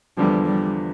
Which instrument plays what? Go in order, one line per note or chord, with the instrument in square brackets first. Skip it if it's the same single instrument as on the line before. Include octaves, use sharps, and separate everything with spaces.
[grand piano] E2 D3 F3 [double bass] G3
[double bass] G3